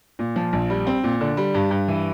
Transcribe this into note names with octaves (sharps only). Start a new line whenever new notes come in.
A#2
F3
A#1
G3
C4
A#2
D3
G3
G2
G2
E3